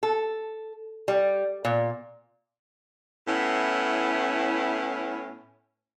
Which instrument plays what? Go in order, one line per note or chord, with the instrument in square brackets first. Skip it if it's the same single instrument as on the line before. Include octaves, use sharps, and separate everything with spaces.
[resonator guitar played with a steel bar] A4
G3
A#2
[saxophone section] A2 B3 C#4 E4